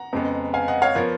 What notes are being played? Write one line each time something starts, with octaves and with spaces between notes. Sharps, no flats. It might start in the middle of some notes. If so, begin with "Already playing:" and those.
Already playing: F#5 A#5
F2 C#3 G#3 B3
F5 G#5
D#5 F#5
C#5 F5
F3 B3 A#4 C#5